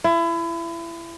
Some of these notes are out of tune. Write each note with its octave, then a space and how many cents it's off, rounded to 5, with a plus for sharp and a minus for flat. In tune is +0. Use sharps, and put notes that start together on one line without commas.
E4 +30